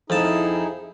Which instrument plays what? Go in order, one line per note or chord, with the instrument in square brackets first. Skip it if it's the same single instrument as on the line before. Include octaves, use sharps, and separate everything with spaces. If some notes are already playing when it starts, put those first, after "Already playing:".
[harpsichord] F2 A5 [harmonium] D#4 E4 G#4